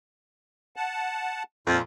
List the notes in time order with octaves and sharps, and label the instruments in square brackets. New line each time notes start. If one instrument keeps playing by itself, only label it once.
[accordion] F#5 A5
[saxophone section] F2 [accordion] A#2 F4